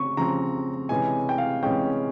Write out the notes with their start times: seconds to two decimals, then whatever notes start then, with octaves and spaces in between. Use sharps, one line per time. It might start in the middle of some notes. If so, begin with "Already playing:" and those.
Already playing: C#3 C4 C#6
0.17 C#3 F3 C4 A#5
0.89 C3 E3 G#3 C#4 G#5
1.29 G5
1.38 F5
1.63 C3 E3 G#3 C#4 G5